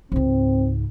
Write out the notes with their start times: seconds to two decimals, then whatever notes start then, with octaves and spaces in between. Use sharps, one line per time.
0.12 C#2 G#2 C4